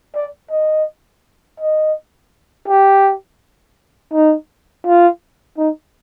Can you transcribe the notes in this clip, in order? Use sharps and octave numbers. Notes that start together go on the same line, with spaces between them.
D5
D#5
D#5
G4
D#4
F4
D#4